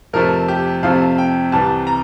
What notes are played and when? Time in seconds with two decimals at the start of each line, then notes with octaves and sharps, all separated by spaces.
0.13 F2 C3 F3 A3 A#4
0.48 G4
0.83 F2 C3 F3 A3 F5
1.18 G5
1.52 C2 C3 E3 G3 A5
1.87 A#5